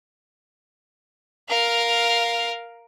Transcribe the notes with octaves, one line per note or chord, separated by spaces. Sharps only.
A#4 F5